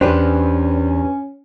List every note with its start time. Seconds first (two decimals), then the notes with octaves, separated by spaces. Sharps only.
0.01 E2 C#4 D4 G4 B4 C5